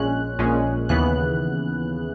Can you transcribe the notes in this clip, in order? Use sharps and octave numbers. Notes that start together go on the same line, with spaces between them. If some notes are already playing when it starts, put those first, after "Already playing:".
Already playing: A#1 A#2 G#3 C#4 F#6
A#1 A#2 G#3 C#4
D#2 C#3 E3 B3 F#6